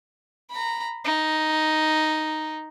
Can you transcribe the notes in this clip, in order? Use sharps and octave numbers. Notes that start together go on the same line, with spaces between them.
A#5 B5
D#4